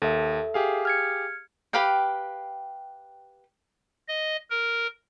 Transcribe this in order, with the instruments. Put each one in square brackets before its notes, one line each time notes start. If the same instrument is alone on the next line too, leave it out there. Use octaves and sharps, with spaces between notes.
[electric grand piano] D#2 [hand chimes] A4 E5
[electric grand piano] G4 G#4 F5
[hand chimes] F6 G#6 C#7
[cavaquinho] G4 B4 F5 G5
[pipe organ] D#5
A#4